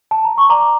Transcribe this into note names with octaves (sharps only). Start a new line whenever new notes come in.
A5
A#5
C#6
D5 A#5 D6